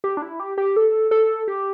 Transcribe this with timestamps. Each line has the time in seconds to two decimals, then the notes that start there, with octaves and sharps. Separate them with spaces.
0.04 G4
0.17 D4
0.22 E4
0.40 G4
0.58 G4
0.76 A4
1.11 A4
1.48 G4